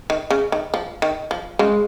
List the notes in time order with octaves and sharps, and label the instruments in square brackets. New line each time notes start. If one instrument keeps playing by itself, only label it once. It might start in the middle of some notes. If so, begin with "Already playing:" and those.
[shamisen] D#3
C#3
D#3
F3
D#3
F3
[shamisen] C#3 [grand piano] G#3